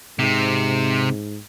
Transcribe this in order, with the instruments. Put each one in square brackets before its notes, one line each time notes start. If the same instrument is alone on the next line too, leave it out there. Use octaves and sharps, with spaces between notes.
[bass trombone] G#2 [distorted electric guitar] C3